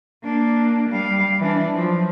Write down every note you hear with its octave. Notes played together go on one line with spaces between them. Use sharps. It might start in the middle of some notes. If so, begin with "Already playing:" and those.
A#3 D4
G3 F5
E3 D4
F3 F#3